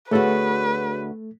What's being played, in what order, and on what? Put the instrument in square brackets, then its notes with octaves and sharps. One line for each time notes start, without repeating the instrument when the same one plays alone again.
[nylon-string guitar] D2 B3 F#4 [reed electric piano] A3 A4 [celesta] G#4 C#5 [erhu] B4